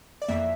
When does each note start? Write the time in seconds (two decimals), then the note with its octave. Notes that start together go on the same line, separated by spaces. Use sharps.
0.22 D5
0.28 F2 E3 A#3 E5